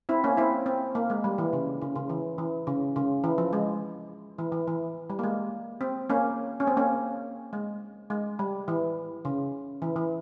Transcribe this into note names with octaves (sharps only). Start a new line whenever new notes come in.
C4 E4
A#3 C#4
C4 E4
C4
A#3
G#3
G3
E3
C#3
C#3
C#3
E3
E3
C#3
C#3
E3
F3
G#3
E3
E3
E3
G3
A#3
G#3
C4
A#3 C#4
C#4
C4
A#3 C#4
G#3
G#3
G3
E3
C#3
E3
E3